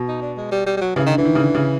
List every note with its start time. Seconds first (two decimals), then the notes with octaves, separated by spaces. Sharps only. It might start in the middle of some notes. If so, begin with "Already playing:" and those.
Already playing: B2
0.08 D#4
0.22 D4
0.37 G#3
0.52 G3
0.66 G3
0.77 G3
0.81 F#3
0.96 C#3 E3
1.06 D3 D#3
1.18 D3 E3
1.25 D#3
1.35 C#3
1.39 D3
1.54 C#3